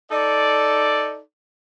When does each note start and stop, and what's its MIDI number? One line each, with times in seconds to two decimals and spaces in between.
0.11 1.19 63
0.11 1.19 69
0.11 1.19 74